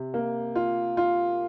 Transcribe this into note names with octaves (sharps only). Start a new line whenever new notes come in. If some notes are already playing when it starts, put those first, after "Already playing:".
Already playing: C3
A#3
F4
F4